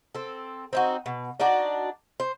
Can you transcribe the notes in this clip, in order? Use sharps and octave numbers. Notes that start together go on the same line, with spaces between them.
C4 A4
C4 D#4 F#4
B2
D4 D#4 F#4 D5
C5